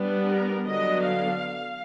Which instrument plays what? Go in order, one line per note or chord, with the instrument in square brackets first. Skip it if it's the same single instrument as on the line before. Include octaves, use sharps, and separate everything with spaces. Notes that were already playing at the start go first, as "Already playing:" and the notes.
Already playing: [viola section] G3 B3 D4
A#4
D3 F#3 B3 D4 D#5
F5